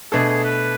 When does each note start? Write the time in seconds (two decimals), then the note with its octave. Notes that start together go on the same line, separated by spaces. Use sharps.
0.12 B2 A3 D4 G#4 A4
0.28 G#4
0.43 B4